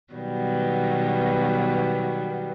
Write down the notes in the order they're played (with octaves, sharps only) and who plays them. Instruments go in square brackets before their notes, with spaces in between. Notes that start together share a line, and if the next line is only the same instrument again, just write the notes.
[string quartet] B2 D#3 F#3 G3 B3